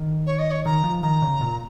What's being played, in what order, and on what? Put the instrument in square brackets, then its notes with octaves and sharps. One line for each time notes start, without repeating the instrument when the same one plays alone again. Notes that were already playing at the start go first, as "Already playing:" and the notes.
Already playing: [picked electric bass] D#3
[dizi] C#5
D#5
C#5
[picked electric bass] D#3 [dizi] A#5
[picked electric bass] F3
[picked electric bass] D#3 [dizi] A#5
[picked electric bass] C#3
A#2